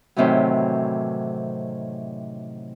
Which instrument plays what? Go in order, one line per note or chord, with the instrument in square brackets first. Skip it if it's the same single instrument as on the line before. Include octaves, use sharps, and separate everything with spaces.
[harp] A2 C3 D#3 E3 F#3